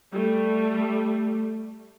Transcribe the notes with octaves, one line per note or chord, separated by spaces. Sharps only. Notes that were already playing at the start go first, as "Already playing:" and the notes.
G3 A3